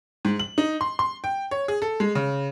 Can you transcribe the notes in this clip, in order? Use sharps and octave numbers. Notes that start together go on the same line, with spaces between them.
G#2
F#7
D#4
C6
C6
G5
C#5
G#4
A4
G#3
C#3